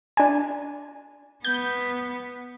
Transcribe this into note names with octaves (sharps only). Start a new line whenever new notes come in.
D4 G#5
B3 G6